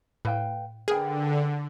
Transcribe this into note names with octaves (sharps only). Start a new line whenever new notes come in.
A2 B4 F5 G5
D3 G#4 A#4 B4 G5